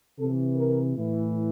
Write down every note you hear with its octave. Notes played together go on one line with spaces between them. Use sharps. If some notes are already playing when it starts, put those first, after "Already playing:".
C3 E3 A4
A#4
A2 E3